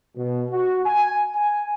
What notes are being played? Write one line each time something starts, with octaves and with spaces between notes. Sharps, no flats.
B2
F#4
G#5
G#5